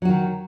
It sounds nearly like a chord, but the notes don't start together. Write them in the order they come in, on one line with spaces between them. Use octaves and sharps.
F#3 F#4 D#3